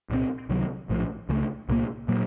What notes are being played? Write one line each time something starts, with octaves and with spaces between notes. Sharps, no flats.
C2 A#2 G3 C4
C#2 C3 D#3 F#3
A#1 A2 F3
C#2 C#3 F#3 A3
C2 A#2 F3 A#3
A#2 F#3 A#3